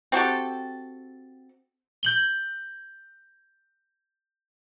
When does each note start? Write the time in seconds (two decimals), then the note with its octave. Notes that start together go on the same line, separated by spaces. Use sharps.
0.12 C4 F#4 G4 A4
2.03 G6 F#7 G7